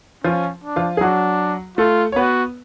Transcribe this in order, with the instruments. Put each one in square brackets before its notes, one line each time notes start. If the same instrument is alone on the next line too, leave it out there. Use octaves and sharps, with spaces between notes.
[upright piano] F3 F4 [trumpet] C#4
[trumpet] D4
[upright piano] F3 F4
G#4
[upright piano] F#3 F#4 [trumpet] D4
[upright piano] A3 A4 [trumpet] F4
[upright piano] C#5
[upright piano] B3 B4 [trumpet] F#4